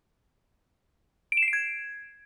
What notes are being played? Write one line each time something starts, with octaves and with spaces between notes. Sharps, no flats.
D7
E7
C7
D7
G#6